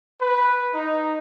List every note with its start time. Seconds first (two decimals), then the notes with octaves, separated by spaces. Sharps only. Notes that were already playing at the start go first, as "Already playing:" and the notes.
0.21 B4
0.74 D#4